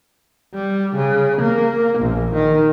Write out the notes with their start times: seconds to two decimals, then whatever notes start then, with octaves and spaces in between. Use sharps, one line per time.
0.54 G3
0.96 C#3
1.41 A#3
1.99 A#1
2.34 D#3